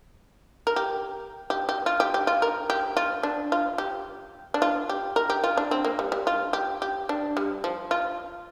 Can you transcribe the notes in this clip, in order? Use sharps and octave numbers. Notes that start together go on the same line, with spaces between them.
A#4
G4
G4
G4
F4
G4
G4
F4
A#4
G4
F4
D4
F4
G4
D4
F4
G4
A#4
G4
F4
D4
C4
A#3
G3
G3
F4
G4
G4
D4
G3
F3
F4